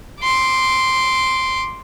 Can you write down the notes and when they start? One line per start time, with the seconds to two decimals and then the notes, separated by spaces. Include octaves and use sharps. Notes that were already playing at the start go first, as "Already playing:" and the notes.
0.21 C6 D6